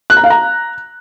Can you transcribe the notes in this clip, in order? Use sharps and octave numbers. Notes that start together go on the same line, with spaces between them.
F#6
A#5
F5
A#5